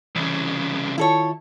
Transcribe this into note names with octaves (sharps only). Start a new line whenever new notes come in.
C2 C#3 E3
D#3 E4 F4 A4 C#5